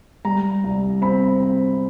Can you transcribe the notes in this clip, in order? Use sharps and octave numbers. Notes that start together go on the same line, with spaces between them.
G3 A#5
C2
C4 B5
C4